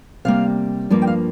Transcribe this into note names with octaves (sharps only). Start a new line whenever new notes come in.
C3 G3 A#3 F5
G2 F3 A#3 D5
G5
F5